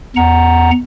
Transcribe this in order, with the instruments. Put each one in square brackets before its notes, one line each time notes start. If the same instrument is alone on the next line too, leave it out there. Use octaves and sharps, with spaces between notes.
[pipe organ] E2 F#5 A#5